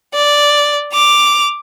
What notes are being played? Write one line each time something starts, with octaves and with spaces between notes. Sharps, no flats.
D5
D6 F7